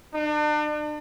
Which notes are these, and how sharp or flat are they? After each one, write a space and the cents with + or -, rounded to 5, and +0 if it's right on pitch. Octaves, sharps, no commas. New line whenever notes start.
D4 +40